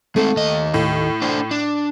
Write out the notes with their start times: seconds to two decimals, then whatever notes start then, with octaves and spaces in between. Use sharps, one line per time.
0.16 G#3 A3 C4
0.37 D#2 D#5
0.74 A2
1.22 D4 C5
1.51 D4